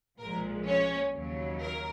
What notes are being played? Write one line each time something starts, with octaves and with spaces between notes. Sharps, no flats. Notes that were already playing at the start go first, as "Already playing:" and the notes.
B1 A#2 F3 G#3 A#4
C#4 C#5
D#2 C#3 F#3
A#4